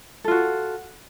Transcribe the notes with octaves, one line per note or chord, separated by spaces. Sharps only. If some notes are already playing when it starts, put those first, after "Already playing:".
F4 F#4 A4